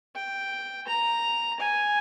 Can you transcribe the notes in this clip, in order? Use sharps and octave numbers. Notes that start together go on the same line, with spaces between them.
G5
A#5
G#5